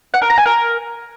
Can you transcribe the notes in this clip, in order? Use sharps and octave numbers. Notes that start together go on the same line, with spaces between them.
F#5
A#4
A#5
G#5
A#4